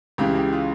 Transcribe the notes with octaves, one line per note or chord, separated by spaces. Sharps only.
C#2 C#3 E3 G4
G4
F4